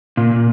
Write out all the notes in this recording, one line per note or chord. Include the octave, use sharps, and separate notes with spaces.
A#2